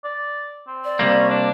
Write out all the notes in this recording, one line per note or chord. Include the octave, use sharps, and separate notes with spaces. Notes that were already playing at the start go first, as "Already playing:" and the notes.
D5
C4
D5
C3 G3 A#3
C#4
D4